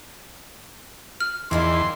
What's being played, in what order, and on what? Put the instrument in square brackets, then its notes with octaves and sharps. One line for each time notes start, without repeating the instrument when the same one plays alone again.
[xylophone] F6
[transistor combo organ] E2 [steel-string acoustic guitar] A#2 D#3 F4 [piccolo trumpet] C6